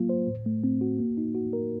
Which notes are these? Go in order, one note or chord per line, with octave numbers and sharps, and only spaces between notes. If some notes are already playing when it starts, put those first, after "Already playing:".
Already playing: F#3 A#3 F4
C5
A2
A3
C4
F#4
A#3
D#4
F#4
A#4